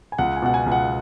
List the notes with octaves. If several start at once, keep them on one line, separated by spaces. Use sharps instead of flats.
G#5
C#2 F#5
G#5
B2 F#5
G#5
C#2
F#5